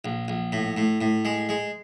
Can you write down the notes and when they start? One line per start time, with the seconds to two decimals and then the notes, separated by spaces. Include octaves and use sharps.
0.05 A#1
0.28 A#1
0.52 A2
0.77 A2
1.01 A2
1.25 G#3
1.49 G#3